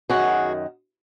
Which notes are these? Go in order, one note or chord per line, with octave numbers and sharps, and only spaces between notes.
F#2 D#3 F#4 G#4